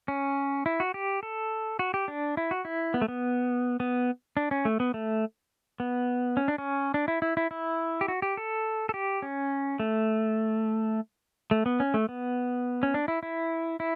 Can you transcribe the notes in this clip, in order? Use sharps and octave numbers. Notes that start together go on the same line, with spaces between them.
C#4
E4
F#4
G4
A4
F#4
G4
D4
E4
F#4
E4
B3
A3
B3
B3
D4
C#4
A3
B3
A3
B3
C#4
D4
C#4
D4
E4
E4
E4
E4
G4
F#4
G4
A4
A4
G4
C#4
A3
A3
B3
C#4
A3
B3
C#4
D4
E4
E4
E4